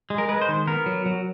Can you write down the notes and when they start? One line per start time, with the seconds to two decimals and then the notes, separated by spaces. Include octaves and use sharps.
0.10 G#3
0.18 A#4
0.29 G#3 B4
0.41 C5
0.49 D#3
0.67 B3 A#4
0.86 F#3
1.06 F#3